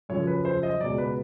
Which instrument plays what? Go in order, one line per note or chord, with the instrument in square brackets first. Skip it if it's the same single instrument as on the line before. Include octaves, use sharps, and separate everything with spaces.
[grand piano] F#2 C#3 F3 C#5
B4
C5
D#5
C#2 B2 F#3 D5
B4